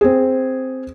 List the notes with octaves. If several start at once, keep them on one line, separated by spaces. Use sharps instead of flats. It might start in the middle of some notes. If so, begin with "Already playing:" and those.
C4 G#4